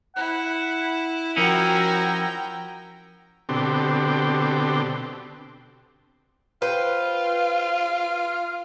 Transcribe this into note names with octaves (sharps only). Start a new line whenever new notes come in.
E4 F#5
F3 C#4 E4 F#4 A#4 G5 A#5
B2 D3 C4 G4
F4 B4 C5 G5